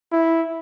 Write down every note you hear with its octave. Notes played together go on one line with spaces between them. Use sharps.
E4